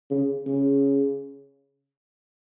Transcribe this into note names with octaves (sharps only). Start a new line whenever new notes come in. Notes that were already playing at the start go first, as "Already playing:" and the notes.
C#3
C#3